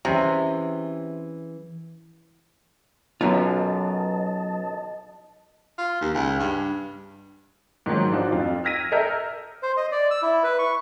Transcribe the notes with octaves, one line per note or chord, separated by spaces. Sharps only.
C3 E3 C#4 G#4
B1 F#2 F#3 B3 F4 D#5 A5
F4
D#2
C#2
G2
G#2 D#3 F3 F#3
D4 D#4 F4 F#4 C5
F2 F4
E6 F6 G#6 A#6 B6 D#7
A4 A#4 D#5 E5 F6 G6
C5
D#5
D5
E6
E4
B4
C#6